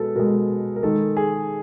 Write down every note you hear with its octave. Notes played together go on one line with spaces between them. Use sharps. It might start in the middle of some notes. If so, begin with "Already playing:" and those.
Already playing: B2 G#3 A4 B4
B2 G#3 A#4
A#4
D#3 G#3 A4
G#4